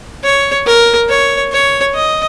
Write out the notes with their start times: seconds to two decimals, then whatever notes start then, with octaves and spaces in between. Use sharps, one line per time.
0.24 C#5
0.66 A#4
1.09 C#5
1.52 C#5
1.94 D#5